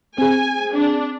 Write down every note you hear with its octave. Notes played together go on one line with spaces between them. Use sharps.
C4 G#4 G#5
D4